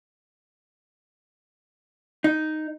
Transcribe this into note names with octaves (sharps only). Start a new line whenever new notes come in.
D#4